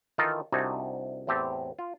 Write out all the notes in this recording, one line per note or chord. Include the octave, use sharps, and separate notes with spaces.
D#3 E3 D#4 F4 A4 A#4
C2 C3 D4 D#4 F#4 G#5
E2 A2 C4 G4 A4
F4